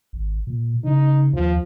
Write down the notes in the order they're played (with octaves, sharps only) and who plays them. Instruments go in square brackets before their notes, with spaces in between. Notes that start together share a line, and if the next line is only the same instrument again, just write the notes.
[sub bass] G#1
A#2
[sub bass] C#3 [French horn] D#4
[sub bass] D#2 [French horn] F3